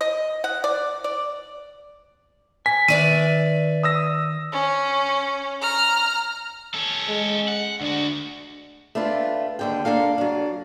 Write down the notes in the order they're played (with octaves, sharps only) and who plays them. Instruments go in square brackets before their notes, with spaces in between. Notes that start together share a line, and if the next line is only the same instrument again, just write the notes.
[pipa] D#5
F#5
D5
D5
[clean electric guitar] G#5 [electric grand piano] B6
[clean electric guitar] D#3 [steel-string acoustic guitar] B4 D5 E5 [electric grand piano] D#7
[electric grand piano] D#6 E6 A#6
[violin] C#4
A#5 F6
[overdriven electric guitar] C#4 A4
[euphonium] G#3
[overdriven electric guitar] F#5
[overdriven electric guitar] D2 F#4 [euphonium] D4
[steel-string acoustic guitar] A3 D4 F4 B4
D#2 D3 G5
A#3 D4 A4 F5
F#3 D4